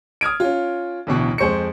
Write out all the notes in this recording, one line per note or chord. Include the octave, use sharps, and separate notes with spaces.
D#6 F6 G#6 D7
C#4 F4
A1 D2 B2 E3
F2 G#3 C5 C#6 C#7